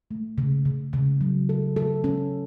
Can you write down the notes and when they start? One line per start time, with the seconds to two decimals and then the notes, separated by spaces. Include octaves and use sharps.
0.11 A3
0.38 C#3
0.65 C#3
0.93 C#3
1.21 F#3
1.49 A4
1.76 A4
2.04 C#4